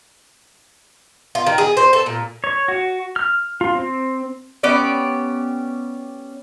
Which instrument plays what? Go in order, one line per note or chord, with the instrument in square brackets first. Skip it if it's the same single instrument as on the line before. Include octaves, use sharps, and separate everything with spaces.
[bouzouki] F4
D#3
G#4
C5
A4
A#2
[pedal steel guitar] C#5
F#4
F6
F4
C4
[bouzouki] B3 C#4 G4 D5